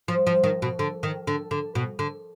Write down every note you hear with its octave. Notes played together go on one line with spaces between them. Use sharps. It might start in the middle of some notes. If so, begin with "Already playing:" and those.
F3
F3
D#3
B2
D3
D#3
D3
D3
B2
D3